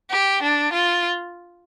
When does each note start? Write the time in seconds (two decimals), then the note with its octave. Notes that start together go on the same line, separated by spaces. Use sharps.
0.11 G4
0.43 D4
0.73 F4